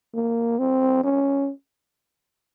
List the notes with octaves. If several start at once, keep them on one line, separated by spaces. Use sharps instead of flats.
A#3
C4
C#4